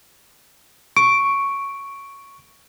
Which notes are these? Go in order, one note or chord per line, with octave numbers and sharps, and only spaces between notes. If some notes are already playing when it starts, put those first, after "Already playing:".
C#6 D7